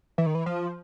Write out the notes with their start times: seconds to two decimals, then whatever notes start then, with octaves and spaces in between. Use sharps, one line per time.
0.18 E3
0.26 D#3
0.35 E3
0.46 F3